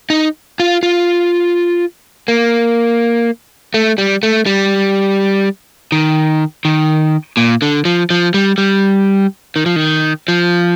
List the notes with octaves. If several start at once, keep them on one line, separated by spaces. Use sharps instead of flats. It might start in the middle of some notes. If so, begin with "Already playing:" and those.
D#4
F4
F4
A#3
A3
G3
A3
G3
D#3
D#3
A#2
D3
F3
F3
G3
G3
D#3
F3
D#3
F3